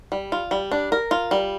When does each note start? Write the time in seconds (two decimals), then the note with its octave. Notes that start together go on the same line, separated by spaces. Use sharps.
0.12 G3
0.32 F4
0.51 G3
0.72 D4
0.92 A#4
1.11 F4
1.31 G3